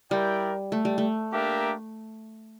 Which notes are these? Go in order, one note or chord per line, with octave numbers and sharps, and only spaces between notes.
G3 E4 A#4 D5 G5
A3
G3
A3
A#3 D4 G4 A#4 E5